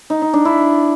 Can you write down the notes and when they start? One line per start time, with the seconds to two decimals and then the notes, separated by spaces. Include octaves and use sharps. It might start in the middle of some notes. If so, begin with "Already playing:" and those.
0.10 D#4
0.22 D#4
0.33 D4
0.45 E4